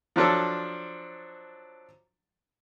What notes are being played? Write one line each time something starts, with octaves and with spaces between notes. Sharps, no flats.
F3 F#3 D4 A4